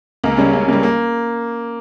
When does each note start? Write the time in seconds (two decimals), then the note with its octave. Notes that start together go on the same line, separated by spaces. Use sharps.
0.24 C#2 A#3
0.38 C#3 G3 C#4
0.53 C#2
0.68 C#3 G3 A#3
0.83 A#3